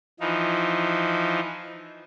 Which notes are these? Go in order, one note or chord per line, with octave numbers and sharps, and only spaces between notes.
E3 F3 D#4